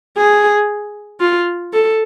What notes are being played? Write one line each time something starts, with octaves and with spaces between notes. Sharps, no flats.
G#4
F4
A4